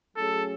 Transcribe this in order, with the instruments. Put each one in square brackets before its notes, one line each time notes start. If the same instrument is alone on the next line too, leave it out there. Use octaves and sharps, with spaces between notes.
[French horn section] F#3 A3 C#4 G#4 [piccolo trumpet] A4